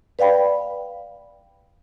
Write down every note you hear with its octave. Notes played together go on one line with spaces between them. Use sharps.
B4 D5 F5 G5 B5